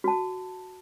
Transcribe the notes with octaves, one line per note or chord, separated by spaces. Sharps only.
F#4 A5